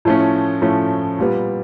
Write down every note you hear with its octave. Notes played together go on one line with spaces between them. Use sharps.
A2 F3 A3 C#4
A2 F3 A3 C#4
A#2 G3 B3